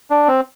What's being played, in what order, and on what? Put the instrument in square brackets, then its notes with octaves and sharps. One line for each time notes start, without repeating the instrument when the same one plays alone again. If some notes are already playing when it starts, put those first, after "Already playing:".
[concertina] D4
C4